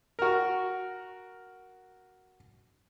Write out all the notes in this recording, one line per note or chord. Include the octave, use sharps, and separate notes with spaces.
F#4 A#4